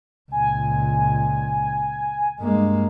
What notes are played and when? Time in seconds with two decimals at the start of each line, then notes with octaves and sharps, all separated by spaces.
0.32 C#2 A#2 G#5
2.40 G2 G#3 A#3